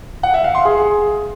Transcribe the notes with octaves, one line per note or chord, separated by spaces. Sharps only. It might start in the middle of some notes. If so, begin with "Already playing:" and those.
F#5
E5
F5
C6
G#4